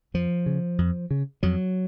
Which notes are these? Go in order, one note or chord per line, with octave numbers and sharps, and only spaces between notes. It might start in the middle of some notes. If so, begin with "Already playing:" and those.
F2 F3
C#3
F2
C#3
F2 F#3